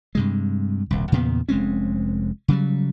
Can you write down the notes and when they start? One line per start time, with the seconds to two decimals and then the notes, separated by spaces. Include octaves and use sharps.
0.15 G2 C3 G#3
0.91 D#1 C2
1.12 E2 A#2 C#3 B3
1.49 F1 G#3 C4 C#4
2.48 C#3 F#3 G3